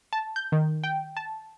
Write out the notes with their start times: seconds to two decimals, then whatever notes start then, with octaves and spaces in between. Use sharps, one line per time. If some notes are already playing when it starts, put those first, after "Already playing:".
0.13 A5
0.36 G6
0.52 D#3
0.84 G5
1.17 A5